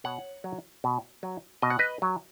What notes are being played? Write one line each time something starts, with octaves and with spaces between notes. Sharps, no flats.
B2 C#5 F#5
F#3
B2
F#3
B2 D#5
F#5
B4 D#5
F#3